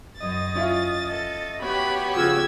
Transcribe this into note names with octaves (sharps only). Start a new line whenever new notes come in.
F#2 D#5 A6
C#4 E4 F4
A4 D#5
B3 F#4 G4 C#5 B5
C#3 F3 E6 G#6